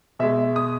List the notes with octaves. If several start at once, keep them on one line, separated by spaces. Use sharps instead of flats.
B2 G#3 E5
D#6